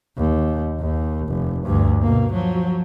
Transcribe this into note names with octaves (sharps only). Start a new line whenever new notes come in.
D#2
D#2
F1
D2 G2
B2 A#3
F3 F#3